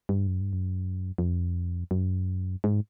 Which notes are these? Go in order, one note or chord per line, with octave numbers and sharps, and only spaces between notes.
G2
F#2
G2
F#2
F2
F#2
G#2